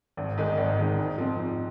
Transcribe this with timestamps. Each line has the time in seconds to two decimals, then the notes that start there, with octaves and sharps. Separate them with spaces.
0.17 G#1
0.38 G#2 D#3 G#3
0.58 G#1
0.78 G#2 D#3 G#3
0.98 G#2
1.18 F3 C4
1.39 G#2